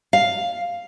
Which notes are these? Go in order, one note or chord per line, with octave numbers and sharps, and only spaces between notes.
F5